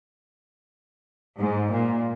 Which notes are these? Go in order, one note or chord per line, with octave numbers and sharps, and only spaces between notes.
G#2
A#2